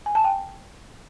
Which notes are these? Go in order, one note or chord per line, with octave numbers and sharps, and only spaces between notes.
G#5
A5
G5